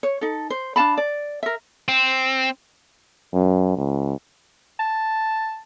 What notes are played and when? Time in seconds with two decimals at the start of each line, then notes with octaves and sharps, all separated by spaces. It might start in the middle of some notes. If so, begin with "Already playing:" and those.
0.03 C#5
0.21 D#4 A4
0.50 C5
0.76 D4 F5 A5 B5
0.97 D5
1.43 A#4 E5
1.88 C4
3.33 F#2
3.76 C#2
4.79 A5